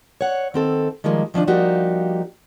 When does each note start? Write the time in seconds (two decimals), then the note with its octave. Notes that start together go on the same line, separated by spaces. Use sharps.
0.21 C#5 F#5
0.54 D#3 C4 A4
1.04 D#3 F3 G3 G#3 A#3
1.34 D#3 F3 C#4 D4
1.48 F3 G3 A#3 D#4 F#4 G4